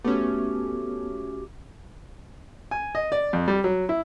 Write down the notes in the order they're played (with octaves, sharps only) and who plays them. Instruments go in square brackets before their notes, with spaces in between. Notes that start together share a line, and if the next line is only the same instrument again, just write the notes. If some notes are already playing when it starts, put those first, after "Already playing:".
[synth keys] A3 C#4 [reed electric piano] B3 [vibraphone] F#4 G4 D6
[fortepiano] G#5
D#5
D5
F2
G3
F#3
E4